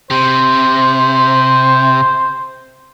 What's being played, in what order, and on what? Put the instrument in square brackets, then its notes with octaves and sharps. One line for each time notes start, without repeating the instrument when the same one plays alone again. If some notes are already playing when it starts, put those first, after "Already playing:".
[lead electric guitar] C3 [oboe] C5